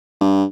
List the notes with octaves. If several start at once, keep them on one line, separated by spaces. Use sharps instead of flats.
G2